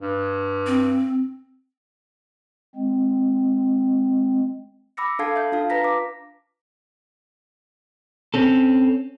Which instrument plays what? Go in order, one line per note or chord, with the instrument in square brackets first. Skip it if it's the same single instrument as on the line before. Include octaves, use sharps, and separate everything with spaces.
[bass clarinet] G2
[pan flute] C4
[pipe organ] G#3 C4
[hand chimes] B5 D6 E6 A#6 C#7
D4 A4 F5 A5 G#6 C7
E5 G6
D4 F4 F5 A5
B4 A#5 A#6 B6
D6
[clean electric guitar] C4 C#4 A4